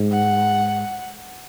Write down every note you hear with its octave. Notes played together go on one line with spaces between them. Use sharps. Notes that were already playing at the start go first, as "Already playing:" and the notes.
Already playing: G#2
F#5